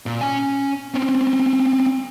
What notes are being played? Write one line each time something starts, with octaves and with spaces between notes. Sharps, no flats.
A#2
C#4 G#5
C4 C#4